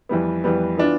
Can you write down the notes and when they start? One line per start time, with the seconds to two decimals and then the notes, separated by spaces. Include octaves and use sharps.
0.09 F2 E3 G3 B3
0.44 F2 E3 G3 B3
0.78 E3 B3 D4 F4